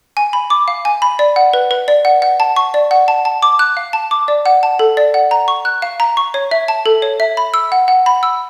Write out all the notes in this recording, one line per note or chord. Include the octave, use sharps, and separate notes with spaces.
G#5
B5
D6
F5
G#5
B5
D5
F#5
B4
B4
D5
F#5
F#5
A5
C#6
D5
F#5
A5
A5
D6
F#6
F5
A5
D6
D5
F#5
A5
A4
D5
F#5
A#5
C#6
F#6
F5
A#5
C#6
C#5
E5
A5
A4
C#5
E5
B5
E6
F#5
F#5
B5
E6